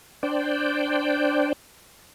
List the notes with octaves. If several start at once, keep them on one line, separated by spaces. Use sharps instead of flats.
D4 C5 D5 G5